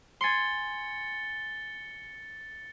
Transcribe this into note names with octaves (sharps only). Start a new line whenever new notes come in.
G#5 C6 A6 C#7 G7